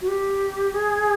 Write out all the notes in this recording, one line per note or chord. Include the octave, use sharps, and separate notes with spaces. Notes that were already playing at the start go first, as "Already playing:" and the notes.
F#4
G4
G#4